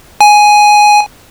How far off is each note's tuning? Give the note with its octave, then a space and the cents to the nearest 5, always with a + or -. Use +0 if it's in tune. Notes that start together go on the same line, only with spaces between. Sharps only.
G#5 +5